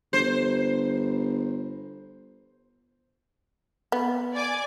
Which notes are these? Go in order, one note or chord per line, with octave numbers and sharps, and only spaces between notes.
G1 C5
B3
D5 G#5 D6